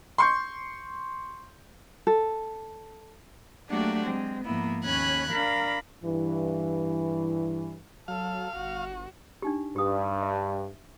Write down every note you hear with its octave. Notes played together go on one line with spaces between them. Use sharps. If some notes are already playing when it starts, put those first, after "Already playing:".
C6 C#6 G6
A4
F#3 A3 A#3 D4 F#4 G4
G#3 C4
G#2 F3 A#3 B3 E4
D#2 C#4 C#5 B5 F#6 G#6
D4 A#4 F5 B5
G2 E3
F#3 A4 F5
G1 F#4
D4 D#4 G4
G2 G4 D#6
E5